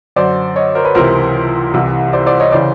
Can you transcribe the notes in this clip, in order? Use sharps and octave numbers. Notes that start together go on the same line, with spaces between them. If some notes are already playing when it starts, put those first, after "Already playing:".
F#2 D3 C5 D5
C#5 D#5
A#4 C5
B4 C#5
C#2 C3 E3 A#4 C5
C2 C3 E3
C5 D5
C5 D5
C#5 D#5
C#3 E3 C5 D5